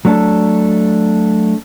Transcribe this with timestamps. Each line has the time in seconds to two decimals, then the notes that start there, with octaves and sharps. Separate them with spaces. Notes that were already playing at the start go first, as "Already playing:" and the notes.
0.05 F#3 A3 D4 A4